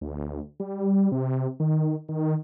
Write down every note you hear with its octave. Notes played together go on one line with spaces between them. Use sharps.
D2
G3
C3
D#3
D#3